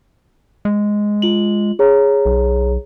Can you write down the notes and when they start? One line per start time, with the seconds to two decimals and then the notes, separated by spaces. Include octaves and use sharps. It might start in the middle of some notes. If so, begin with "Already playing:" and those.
0.65 G#3
1.22 F4 F#7
1.79 G#4 C#5 A#5
2.26 B1